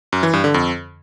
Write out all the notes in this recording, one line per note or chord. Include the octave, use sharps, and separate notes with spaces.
F#2
E3
G2
D3
F2